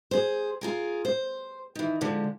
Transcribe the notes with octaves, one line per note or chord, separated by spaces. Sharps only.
G#4 C5
F4 G#4 A#4
C5
D#3 E3
D3 F3 G#3